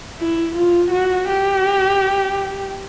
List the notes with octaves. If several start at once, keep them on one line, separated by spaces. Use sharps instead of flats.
E4
F4
F#4
G4